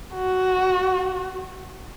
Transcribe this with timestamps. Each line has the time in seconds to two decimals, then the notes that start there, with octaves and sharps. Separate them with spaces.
0.15 F#4